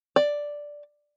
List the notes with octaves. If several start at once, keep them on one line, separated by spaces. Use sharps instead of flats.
D5